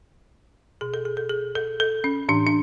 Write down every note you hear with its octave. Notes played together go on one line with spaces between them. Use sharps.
B2 G#4
A4
G#4
A4
G#4
A4
A4
C#4
A2 E3 D4
D4